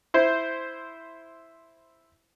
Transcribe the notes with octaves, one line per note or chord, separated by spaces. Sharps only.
E4 C5